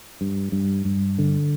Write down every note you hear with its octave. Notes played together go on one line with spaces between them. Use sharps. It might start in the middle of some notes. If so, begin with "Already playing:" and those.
G2
G2
G2
D3